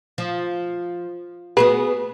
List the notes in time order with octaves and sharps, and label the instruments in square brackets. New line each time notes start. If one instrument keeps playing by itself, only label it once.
[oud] F3
[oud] B3 F#4 G#4 [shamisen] B4